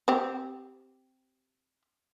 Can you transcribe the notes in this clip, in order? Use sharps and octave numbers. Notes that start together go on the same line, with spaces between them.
C4 G4